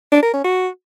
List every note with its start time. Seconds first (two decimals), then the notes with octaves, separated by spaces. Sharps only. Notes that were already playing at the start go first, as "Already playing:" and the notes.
0.12 D4
0.23 A#4
0.33 C#4
0.44 F#4